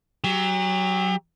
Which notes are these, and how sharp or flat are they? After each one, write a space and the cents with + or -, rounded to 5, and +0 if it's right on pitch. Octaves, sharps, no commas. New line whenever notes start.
F#3 +15 G4 +40